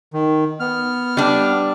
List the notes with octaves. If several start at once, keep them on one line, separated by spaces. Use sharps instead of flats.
D#3
B3 F6
G3 D4